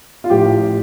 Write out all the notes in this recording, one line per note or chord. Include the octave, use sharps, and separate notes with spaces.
F4
A1 A2 F3 G4